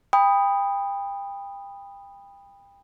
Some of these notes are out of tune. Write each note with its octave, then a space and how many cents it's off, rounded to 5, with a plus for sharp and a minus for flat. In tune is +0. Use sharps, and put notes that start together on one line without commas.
G5 +30 B5 +5 D#6 +0